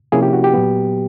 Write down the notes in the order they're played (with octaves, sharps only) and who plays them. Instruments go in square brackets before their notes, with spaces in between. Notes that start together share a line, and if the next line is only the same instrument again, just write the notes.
[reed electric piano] C3 F3 A#3 C#4 E4 G#4
G4
F#4
G4
A#2 F#3 B3